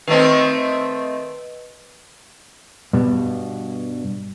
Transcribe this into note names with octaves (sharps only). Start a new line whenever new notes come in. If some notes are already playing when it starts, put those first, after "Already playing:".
D#3 A3 C4 B4 D#5
G2 B2